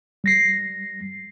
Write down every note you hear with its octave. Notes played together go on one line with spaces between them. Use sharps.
G3 A#6 C7